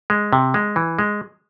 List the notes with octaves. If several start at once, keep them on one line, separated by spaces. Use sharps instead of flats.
G#3
C3
G#3
E3
G#3